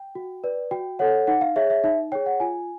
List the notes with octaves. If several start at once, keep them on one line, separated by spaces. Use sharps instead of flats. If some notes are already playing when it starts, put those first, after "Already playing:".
Already playing: G5
F#4
B4 D5
F#4 G5
A4 C#5 F#5
D#4 F#5
F5
G#4 C#5 E5
E5
D#4 E5
G#4 C#5 G5
F#5
F4 G#5